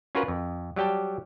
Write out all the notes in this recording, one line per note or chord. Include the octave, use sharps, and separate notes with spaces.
C#4 F4 F#4 A#4 B4
F2
F#3 G3 G4 G5 A5